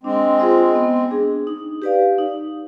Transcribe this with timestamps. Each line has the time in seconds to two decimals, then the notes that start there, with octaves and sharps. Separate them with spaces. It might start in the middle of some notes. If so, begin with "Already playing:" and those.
0.03 G#3 C4 D4
0.39 F4 G#4 C5 D#5
0.75 B3
1.11 D4 G#4
1.47 D#4
1.82 G4 B4 D5 F5
2.18 D#4